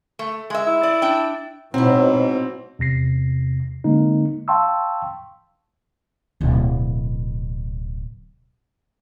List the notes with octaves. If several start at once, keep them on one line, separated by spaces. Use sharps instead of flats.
A3
G#3 E5
E4
D5
D4 G5
G#2 B2 F#3 C4 E4
E2 C3 A#6 C7
D3 G#3 A#3 C4 D#4
F5 G5 A5 C6 C#6 E6
D1 B2